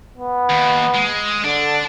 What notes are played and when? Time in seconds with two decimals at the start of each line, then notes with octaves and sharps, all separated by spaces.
0.17 B3
0.50 D#2
0.94 G#3
1.44 D3 D4